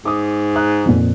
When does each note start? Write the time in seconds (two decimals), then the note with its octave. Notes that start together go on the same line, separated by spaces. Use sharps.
0.05 G#2 D6 D#6
0.55 A#5 D#6 F#6
0.85 F2 A#2